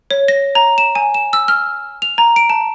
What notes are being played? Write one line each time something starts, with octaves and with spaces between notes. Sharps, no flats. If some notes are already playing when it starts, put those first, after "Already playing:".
C#5
A#6
A#5
E7
G#5
E7
E6
F6
F7
A#5
D7
A5